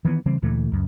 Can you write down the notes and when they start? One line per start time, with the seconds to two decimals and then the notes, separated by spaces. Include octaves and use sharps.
0.05 D#3 E3 A3 B3
0.26 C#3 E3 G3 C4
0.42 D2 A#2 E3 A3
0.72 C#2 F#2